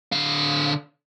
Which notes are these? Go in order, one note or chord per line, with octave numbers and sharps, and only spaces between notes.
D3 F5